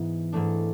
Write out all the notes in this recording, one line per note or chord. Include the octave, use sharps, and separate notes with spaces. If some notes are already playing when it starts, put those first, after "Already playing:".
Already playing: G#2 E3 B3
G#2 E3 A3 D4